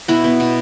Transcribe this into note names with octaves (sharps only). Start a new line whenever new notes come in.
B2 E4 F#4
B3
B2